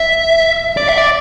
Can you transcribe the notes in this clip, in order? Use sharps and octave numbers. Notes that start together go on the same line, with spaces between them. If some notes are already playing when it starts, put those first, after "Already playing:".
Already playing: E5
D5
E5
D5